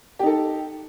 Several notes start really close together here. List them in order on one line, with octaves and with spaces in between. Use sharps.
G4 D#4 A4